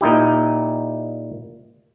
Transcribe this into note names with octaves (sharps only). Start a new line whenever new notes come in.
A#2 D#4 E4 G4